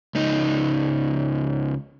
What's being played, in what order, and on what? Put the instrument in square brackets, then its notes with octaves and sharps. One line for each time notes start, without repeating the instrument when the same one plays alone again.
[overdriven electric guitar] C#2 D#4